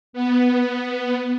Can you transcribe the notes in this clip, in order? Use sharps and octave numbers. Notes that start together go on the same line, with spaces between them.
B3